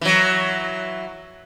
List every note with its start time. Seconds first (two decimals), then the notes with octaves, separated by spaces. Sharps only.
0.01 E3 F#3